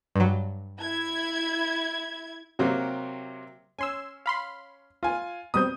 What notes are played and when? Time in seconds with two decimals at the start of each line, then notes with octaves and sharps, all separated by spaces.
0.16 G2 F#3
0.81 E4 G#6
2.59 C3 F#3 A#3 C4 G4
3.79 C#4 G#5 C6 E6
4.26 F5 B5 C6
5.03 F4 G#5
5.54 B2 G3 C4 D#6 G6